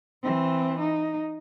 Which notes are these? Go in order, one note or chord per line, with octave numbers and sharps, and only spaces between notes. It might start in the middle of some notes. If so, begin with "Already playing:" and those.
E3 C4
D#4